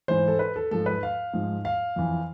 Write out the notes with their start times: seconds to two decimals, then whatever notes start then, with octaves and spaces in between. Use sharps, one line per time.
0.08 G#2 E3 C5
0.28 A4
0.39 B4
0.56 A4
0.71 G#2 F3 A4
0.86 B4
1.03 F5
1.33 G#2 F3
1.65 F5
1.96 F2 E3